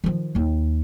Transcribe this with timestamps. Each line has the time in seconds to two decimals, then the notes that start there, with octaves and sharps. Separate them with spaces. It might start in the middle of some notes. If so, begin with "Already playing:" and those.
0.04 D#3 F3
0.35 D#2 D#4